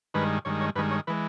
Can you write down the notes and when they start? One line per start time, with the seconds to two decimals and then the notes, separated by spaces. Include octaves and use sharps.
0.14 G2 D#3 G#3 B4
0.45 G2 D#3 G#3 C#5
0.60 C#5
0.75 G2 D#3 G#3 B4
0.91 C#5
1.07 E3 G#3 B4